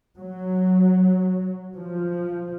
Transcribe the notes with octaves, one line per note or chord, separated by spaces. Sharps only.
F#3
F3